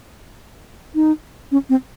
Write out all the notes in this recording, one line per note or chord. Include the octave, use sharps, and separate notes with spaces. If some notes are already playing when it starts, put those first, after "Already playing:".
D#4
C#4
C4